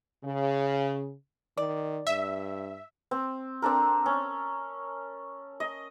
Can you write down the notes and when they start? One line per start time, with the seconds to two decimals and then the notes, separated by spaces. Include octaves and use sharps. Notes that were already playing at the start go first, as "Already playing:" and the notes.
0.24 C#3
1.57 D#3 D5
2.07 G2 E5
3.11 C4
3.62 C4 D4 A4 A#4
4.06 C#4
5.60 D#5